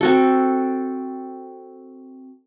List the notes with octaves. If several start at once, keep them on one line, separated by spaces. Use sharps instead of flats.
C4 F#4 A4